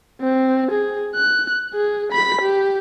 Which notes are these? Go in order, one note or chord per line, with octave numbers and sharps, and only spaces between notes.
C4
G#4
F#6
G#4
B5 B6
G4